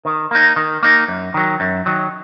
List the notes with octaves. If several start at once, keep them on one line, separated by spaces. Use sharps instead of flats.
D#3
A#3 D#4
D#3
A#3 D#4
F#2
D#3 F#3
F#2
D#3 F#3